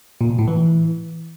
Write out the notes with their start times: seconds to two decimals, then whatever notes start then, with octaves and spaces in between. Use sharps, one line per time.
0.21 A#2
0.30 B2
0.39 A2
0.48 E3